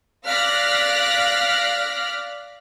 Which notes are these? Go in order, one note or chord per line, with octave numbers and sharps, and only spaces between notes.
D5 F5 F6 F#6 A#6 B6